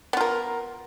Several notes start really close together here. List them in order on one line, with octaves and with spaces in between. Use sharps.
B3 F4 A#4